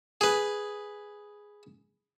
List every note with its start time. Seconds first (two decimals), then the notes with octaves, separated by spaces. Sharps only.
0.21 G#4 B4